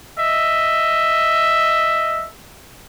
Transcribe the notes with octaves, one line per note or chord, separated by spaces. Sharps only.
D#5 E5